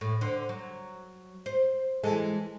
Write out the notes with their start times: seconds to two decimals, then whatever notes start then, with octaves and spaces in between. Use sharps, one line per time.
0.01 A2
0.21 D3 C5
0.49 F#3
1.46 C5
2.04 E3 G#3 A4